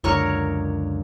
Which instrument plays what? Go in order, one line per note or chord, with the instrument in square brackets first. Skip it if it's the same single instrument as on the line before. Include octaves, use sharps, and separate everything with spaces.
[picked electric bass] C#2 F#2 D3 [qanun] A#4 C#5 C#6